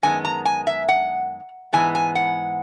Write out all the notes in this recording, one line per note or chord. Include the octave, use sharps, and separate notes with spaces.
F#2 D#3 G#3 B3 G#5
A#5
G#5
E5
F#5
G#2 E3 G#3 B3 G#5
G#5
F#5